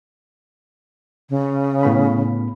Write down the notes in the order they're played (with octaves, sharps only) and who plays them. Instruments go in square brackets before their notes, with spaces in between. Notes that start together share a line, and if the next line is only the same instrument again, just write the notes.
[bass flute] C#3
[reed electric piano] A2 B3 B5